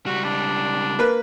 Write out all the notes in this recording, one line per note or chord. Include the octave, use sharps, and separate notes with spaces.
C#2 G3 F#4
D4
A#3 B4